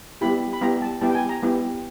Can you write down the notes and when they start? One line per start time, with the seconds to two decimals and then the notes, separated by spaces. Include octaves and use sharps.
0.21 G3 B3 E4 G4 B5
0.53 B5
0.61 G3 B3 E4 G4 A#5
0.82 A5
1.01 G3 B3 E4 G4 A5
1.10 G5
1.15 G#5
1.29 A#5
1.42 G3 B3 E4 G4